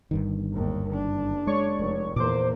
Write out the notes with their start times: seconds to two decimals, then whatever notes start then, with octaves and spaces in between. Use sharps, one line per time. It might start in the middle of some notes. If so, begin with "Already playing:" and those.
0.11 G1 G2 D#3
0.53 G#1 D#2
0.90 F#1 D4
1.47 G#3 C#5 D5 C#6
1.78 F1
2.16 E2 A#2 A#3 C5 D6